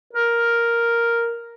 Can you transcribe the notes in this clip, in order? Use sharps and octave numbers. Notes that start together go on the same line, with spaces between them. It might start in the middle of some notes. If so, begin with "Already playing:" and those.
A#4